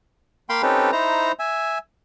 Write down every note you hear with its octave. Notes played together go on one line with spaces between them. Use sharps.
A#3 F5 G5 B5 C6
C4 C#4 D#4 G4 A4 B4
D#4 E4 C5 A#5
E5 G#5